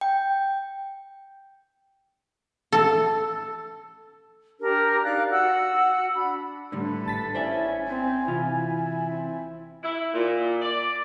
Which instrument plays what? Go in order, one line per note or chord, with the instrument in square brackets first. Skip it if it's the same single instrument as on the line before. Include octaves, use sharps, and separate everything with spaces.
[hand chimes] G5
[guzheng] A4
[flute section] D4 G4 A#4
D#4 D5 F5 F#6
F#4 F#5 E6
D4 B5
[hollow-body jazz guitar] A2 D3 G3 [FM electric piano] D4 [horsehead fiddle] A4 B4
[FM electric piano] G#1 A6 B6 [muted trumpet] A5
[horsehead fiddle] C#4 E4 [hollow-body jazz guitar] C5 D5 E5 [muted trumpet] G#5
[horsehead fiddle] C4
[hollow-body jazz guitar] C3 E3 F4 [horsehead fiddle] E4
[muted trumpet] C4
[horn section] E4
A#2
D5